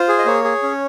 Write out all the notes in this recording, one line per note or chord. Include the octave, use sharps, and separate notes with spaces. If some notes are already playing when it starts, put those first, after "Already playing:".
Already playing: F4 C5
G#4
D#5
A#3 C#5
G#4
C#4